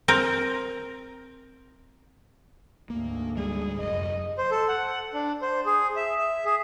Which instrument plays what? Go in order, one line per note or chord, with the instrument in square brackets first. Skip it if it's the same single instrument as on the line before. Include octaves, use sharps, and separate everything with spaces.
[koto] C4 A#4
[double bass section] D2 G#2 [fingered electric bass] A#3
[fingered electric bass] G3 G#3 [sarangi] G#4
[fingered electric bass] F1 [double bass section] F#2 [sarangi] D#5
[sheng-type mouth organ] C5
A4
F#5
D4
C5
G#4
E5
E5
G#4